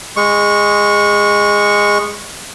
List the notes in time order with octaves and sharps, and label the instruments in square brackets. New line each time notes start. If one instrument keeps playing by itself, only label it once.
[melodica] G#3 C#6